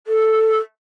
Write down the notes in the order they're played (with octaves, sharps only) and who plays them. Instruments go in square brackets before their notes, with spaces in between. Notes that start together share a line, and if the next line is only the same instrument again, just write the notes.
[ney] A4